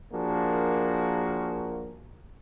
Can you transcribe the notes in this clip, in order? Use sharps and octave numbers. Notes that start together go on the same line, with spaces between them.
F3 A#3 D4 F#4 G#4 A#4